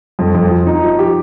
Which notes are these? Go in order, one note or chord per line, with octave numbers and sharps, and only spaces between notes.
F2
F2
F3
D#4
F3
G4